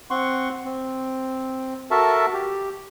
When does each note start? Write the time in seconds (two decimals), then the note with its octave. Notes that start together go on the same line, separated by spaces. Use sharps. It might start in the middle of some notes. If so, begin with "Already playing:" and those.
0.10 C4 F#5 C6 C#6
0.65 C4
1.91 F#4 A4 A#4 E5 A5
2.33 G4